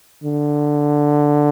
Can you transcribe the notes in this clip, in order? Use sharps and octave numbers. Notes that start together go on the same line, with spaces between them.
D3